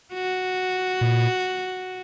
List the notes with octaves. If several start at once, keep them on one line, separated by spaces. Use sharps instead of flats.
F#4
A#2